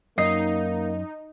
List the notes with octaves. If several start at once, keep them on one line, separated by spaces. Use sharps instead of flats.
F#2 A#3 D#4 D#5 C7